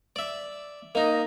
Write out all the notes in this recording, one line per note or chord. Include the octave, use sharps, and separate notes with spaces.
D5 E5
A#3 D#4 D#5